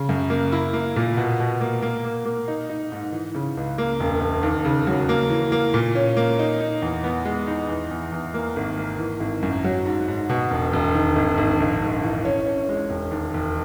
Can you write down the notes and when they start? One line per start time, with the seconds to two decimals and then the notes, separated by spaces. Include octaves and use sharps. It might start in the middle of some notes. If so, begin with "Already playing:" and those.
Already playing: C#3
0.09 F#2
0.30 A#3
0.52 E4
0.73 A#3
0.96 A#2
1.17 B2
1.40 B2
1.61 A#3
1.82 A#3
2.05 A#3
2.26 A#3
2.48 D#4
2.69 D#4
2.92 G#2
3.12 E3
3.35 C#3
3.57 C#2
3.78 A#3
4.00 E1
4.21 E1
4.43 D#2
4.65 C#3
4.87 F#3
5.09 A#3
5.30 E3
5.52 A#3
5.74 A#2
5.95 C#4
6.17 A#3
6.39 D#4
6.60 D#4
6.82 E2
7.04 B3
7.25 G#3
7.47 D#4
7.69 E2
7.91 E2
8.12 E2
8.34 A#3
8.56 G#1
8.78 A#3
8.99 E3
9.20 G#1
9.42 F#2
9.64 F#3
9.85 G#2
10.08 G#2
10.29 B2
10.51 E1
10.73 E1
10.95 D#3
11.16 G#1
11.38 G#1
11.60 A#1
11.82 G#2
12.03 E3
12.25 C#4
12.47 C#4
12.69 G#3
12.89 E1
13.11 D#2
13.34 E1